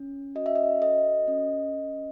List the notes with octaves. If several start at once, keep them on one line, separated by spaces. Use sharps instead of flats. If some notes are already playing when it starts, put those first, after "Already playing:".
Already playing: C#4
F#4 D#5
E5
D#5
A4 D#5
C#4
C#4